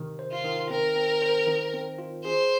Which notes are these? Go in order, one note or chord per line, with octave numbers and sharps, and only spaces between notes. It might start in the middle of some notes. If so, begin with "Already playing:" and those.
Already playing: C3 D#3
C5
F4
D#3
C4 A#4
C4
C5
D#3
C4
F4
G#4 C5